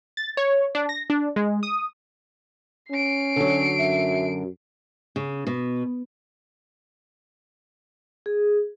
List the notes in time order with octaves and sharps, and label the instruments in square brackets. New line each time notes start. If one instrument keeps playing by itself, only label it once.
[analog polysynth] A6
C#5
D4
A#6
D4
G#3
D#6
[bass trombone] C#4 [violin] C7 D7
[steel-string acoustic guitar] D3 F#3
[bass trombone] F#2 [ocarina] E5
[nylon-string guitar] C#3
B2
[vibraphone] G#4